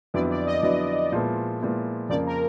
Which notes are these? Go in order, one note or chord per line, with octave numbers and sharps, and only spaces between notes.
F2 D3 F#3 B3 E4 D5
D5
D#5
F2 D3 F#3 B3 E4 D#5
A#2 F3 G#3 B3 E4
A#2 F3 G#3 B3 E4
F2 C#3 F3 A#3 D5
A#4